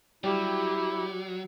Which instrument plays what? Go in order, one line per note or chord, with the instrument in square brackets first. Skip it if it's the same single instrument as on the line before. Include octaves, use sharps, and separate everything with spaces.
[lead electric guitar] F#3 [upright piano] G3 [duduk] E4 [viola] G4